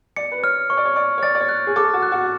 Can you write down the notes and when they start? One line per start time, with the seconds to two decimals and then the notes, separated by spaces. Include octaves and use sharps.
0.17 D5 C#7
0.32 B4
0.43 C#5 F6
0.70 C#5 C#6
0.77 D5
0.85 C#5
0.96 D5 C#6
1.18 C#5
1.23 D5 A6
1.35 D5
1.41 C#5
1.49 F#6
1.67 G#4
1.76 A4 D6
1.93 F#4
2.02 F#6
2.12 F#4